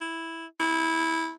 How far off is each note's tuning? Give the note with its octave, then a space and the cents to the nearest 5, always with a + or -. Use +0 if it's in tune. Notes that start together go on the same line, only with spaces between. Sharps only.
E4 -5
E4 -15